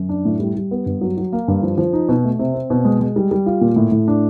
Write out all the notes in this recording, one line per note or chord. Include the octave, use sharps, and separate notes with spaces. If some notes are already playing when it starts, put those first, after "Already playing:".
Already playing: F#2
D4
A2
G3
G3
B3
G2
F#3
F#3
A#3
G2
F3
F3
D#4
B2
A3
C3
C4
B2
G#3
G#3
G3
G3
F4
A#2
A2
A2
D4